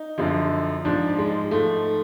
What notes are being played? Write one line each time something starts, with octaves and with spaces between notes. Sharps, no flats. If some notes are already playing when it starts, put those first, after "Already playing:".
Already playing: D#4
F#2 D3 F3
G#2 F3 D4
G#3
G#2 F3 A3